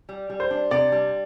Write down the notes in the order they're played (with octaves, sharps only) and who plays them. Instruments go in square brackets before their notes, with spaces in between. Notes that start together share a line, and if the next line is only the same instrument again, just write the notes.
[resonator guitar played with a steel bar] G3
G3
[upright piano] C5
[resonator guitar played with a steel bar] D4
[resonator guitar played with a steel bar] C3 [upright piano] D5
[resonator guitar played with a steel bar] G3